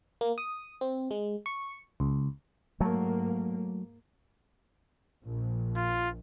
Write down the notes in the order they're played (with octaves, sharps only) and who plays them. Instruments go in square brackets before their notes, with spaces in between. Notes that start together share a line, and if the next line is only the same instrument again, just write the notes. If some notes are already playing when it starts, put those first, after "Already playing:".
[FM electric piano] A#3
D#6
C4
G#3
C#6
C#2
[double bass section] G#2 A#3 [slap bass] F#3 A3
[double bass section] A#1
[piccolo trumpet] F4